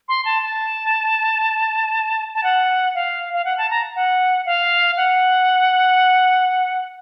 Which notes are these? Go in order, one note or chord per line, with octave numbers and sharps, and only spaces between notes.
C6
A5
A5
A5
F#5
F5
F5
F#5
A5
A#5
F#5
F5
F#5